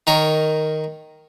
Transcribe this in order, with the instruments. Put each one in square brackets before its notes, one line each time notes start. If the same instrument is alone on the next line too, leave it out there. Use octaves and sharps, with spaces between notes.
[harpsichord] D#3 A#4 C#5